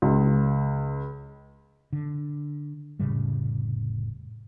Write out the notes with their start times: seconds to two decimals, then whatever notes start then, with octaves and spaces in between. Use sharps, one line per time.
0.02 C#2
1.93 D3
2.99 F1 A2 C#3 G3